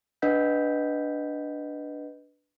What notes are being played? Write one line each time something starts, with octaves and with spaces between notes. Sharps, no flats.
D4 B4 D#5 F#5 G6 B6